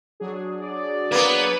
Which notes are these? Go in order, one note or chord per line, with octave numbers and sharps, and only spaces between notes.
F#3 D4 G#4
D5
A#3 B3 B4